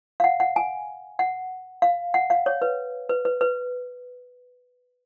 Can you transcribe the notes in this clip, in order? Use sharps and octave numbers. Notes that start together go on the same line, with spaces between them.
F5
F#5
F#5
G#5
F#5
F5
F#5
F5
C#5
B4
B4
B4
B4